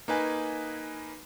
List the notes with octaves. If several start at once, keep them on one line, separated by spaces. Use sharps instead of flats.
A#3 D#4 B4 G#5